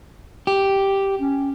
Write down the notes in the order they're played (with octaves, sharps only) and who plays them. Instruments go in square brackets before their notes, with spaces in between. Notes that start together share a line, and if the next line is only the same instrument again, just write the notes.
[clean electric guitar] G4
[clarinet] C#4